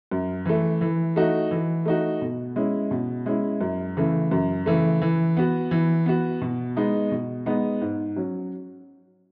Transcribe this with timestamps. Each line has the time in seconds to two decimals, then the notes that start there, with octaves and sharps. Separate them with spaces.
0.11 F#2
0.45 E3 A3
0.81 E3
1.16 A3 D#4 F#4
1.51 E3
1.86 A3 D#4 F#4
2.22 B2
2.56 G#3 C#4 E4
2.91 B2
3.26 G#3 C#4 E4
3.61 F#2
3.97 C#3 E3 A3
4.31 F#2
4.66 C#3 E3 A3
5.02 E3
5.37 B3 F#4
5.71 E3
6.06 B3 F#4
6.42 B2
6.77 G#3 B3 D#4
7.12 B2
7.46 G#3 B3 D#4
7.81 G#2
8.16 F#3 C#4